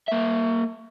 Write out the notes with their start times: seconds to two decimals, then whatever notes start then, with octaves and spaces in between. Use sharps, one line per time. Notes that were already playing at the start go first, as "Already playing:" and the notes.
0.08 A#3 E5